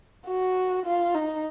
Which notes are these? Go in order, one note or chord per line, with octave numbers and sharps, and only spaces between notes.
F#4
F4
D#4